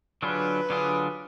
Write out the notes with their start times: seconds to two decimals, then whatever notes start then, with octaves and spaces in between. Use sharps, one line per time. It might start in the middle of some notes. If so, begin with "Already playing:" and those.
0.22 D3 F#3 D4 F4 G#4 B4
0.70 D3 F#3 D4 F4 G#4